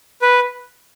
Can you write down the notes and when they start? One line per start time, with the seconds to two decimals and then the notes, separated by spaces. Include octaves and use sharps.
0.22 B4